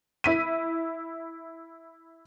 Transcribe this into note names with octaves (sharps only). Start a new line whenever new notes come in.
E4 B6 D#7